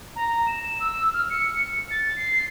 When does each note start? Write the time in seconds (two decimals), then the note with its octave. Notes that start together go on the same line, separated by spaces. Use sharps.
0.16 A#5
0.47 E7
0.80 E6
1.13 F6
1.30 C#7
1.91 A6
2.16 C7